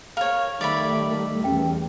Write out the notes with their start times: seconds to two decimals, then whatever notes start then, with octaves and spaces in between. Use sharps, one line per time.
0.17 A#4 C#5 F5
0.61 D#3 G3 A3 D5 E5 B5
1.44 E2 C#4 G5